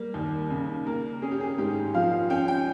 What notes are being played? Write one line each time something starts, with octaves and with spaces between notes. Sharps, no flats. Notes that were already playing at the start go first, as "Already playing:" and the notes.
Already playing: G3 A#3
D#2
C#3
A#3 A#4
C#4 G#4
G4
G#4
G#2 G4
F3 F5
C#4 G5
G5